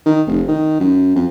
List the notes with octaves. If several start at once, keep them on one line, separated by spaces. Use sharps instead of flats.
D#3
F1
D#3
F#2
F2